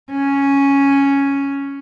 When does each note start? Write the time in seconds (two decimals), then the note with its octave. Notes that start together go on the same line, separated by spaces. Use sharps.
0.12 C#4